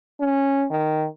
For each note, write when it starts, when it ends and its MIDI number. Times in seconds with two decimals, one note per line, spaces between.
0.20 0.66 61
0.71 1.06 51